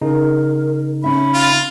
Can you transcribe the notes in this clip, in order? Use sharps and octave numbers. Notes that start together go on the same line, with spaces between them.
C#3 D#4 A#4
C#4 E5 B5
F4